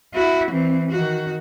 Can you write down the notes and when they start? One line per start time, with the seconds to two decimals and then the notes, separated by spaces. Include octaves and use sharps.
0.14 E4 F#4
0.51 E3 C4
0.91 D#3 F#4